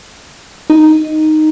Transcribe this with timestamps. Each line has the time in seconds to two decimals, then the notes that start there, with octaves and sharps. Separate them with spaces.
0.70 D#4